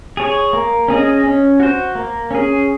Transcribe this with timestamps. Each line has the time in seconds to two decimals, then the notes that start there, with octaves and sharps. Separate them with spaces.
0.17 G#4 C#5
0.53 A#3
0.88 C#4 G#4 D#5
1.24 C#4
1.60 F#4 C5
1.95 A#3
2.31 C#4 G#4